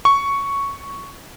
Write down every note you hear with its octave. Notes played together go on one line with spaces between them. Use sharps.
C#6